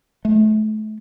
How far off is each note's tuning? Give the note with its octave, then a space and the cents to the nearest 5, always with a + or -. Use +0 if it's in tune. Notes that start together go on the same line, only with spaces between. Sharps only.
A3 -35